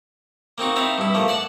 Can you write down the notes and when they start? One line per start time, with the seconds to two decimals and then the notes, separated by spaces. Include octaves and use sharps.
0.58 A#3 C4 D#4 F#4
0.76 C4 D#4 E4 F5
0.98 G2 E4
1.14 F3 A3 A#3
1.28 D5 F#5 A5